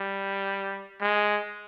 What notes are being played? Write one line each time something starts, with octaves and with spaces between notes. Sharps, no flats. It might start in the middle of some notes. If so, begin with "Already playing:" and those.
Already playing: G3
G#3